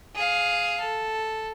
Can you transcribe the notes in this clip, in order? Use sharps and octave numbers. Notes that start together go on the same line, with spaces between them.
G#4 F5
A4